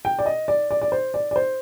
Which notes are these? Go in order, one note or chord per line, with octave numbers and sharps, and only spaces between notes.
G5
D5
D#5
D5
D5
D5
C5
D5
D5
C5